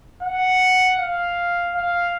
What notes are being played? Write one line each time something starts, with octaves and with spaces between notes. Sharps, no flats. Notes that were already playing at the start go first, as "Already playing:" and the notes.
F#5
F5
F5